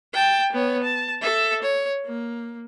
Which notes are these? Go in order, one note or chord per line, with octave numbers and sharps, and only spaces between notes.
G5 A5
B3 C#5
A5
A4 E5
C#5
A#3